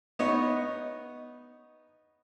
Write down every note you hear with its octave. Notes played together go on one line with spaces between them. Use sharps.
B3 D#4 C#5